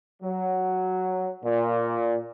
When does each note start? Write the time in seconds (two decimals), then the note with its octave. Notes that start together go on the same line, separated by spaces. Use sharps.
0.23 F#3
1.44 A#2